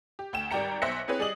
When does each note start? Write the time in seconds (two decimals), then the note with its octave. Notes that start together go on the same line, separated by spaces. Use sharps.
0.19 G4
0.33 D2 G5 E7
0.51 G#1 G3 D5 G5 A#5 C#7
0.82 B1 C5 E5 F#6 A#6 C#7
1.08 C4 E4 G#4 B4 C#5
1.19 G3 G#4 D5 D#5 D#6 F#7